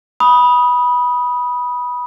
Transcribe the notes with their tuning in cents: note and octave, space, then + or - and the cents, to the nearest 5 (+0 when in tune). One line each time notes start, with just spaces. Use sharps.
B5 -15 D#6 +5